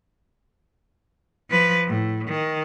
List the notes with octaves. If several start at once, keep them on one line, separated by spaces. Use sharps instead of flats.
F3 B4
A2
D#3